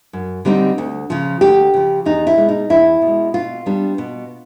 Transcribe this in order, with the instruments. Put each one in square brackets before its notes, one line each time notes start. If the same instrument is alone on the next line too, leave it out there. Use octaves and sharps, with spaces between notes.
[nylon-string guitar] F#2
D3 G3 C4 D#4
D2
C#3 F3
D2 G4
C#3 F3
E2 D#4
E4
B2 G#3
D#4
E2 E4
B2
G#3
B2 F4
G3 B3 D4
B2